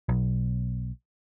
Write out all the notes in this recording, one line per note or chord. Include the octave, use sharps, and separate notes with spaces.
B1